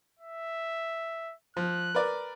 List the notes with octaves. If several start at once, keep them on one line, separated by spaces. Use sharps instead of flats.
E5
F3 F#6
A#4 B4 D5